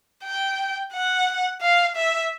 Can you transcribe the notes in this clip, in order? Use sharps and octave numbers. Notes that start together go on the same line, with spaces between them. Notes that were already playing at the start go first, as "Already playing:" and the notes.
G5
F#5
F5
E5